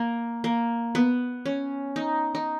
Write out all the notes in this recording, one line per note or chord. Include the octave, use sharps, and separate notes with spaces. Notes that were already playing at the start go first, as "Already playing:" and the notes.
Already playing: A#3
A#3
B3
C#4
D#4
D#4